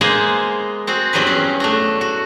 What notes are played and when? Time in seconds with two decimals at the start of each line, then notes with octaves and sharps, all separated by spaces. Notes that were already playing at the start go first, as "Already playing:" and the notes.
0.01 G#3 A#3 B3 G#4 C5 G#5
0.87 C4 F#4 G#4
1.13 E2 G2 F#3 G3 G#4 B4
1.27 C#4
1.60 A3 D4 F#4
2.01 F#4